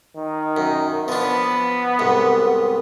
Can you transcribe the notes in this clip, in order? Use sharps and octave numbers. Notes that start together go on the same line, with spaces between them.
D#3
F#2
F3 B3 D4
C2 G#2